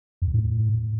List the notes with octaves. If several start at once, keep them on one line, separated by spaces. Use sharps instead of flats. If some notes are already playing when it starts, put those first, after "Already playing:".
F2
E2
A2